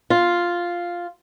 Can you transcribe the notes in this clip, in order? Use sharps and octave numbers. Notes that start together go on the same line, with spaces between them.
F4